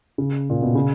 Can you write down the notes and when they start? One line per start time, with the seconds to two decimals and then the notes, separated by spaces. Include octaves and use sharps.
0.18 C#3
0.50 A#2
0.62 B2
0.75 C#3